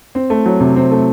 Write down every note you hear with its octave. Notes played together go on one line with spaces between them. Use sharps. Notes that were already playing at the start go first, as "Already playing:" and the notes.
C4
A3
F#3
C3
C4
A3